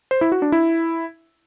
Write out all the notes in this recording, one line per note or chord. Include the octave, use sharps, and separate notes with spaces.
C5
E4
F#4
D4
E4